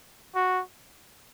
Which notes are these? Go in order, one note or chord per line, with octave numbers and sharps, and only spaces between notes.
F#4